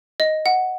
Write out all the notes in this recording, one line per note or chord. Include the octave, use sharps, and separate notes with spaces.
D#5
F#5